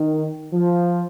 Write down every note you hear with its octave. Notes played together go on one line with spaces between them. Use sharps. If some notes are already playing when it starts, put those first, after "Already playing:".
Already playing: D#3
F3